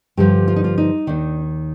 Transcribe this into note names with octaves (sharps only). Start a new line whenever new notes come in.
G2 D3 F3 G4
F4
D#4
F4
D#4
D#2 D#3 D4